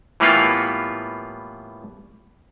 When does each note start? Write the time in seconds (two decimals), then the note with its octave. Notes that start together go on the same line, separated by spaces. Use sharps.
0.20 A2 E3 G3 A#3 B3 F4